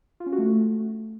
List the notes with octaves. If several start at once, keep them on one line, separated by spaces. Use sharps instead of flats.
F4
C#4
F#4
A3